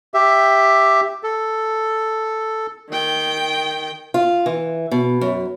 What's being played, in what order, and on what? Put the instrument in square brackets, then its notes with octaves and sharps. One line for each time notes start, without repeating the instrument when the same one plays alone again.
[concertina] G4 E5
A4
[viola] D#3 G5
[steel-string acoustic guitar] F4
E3
B2
F#2